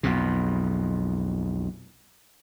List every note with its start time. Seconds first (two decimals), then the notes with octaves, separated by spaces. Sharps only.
0.03 B1 F2 B2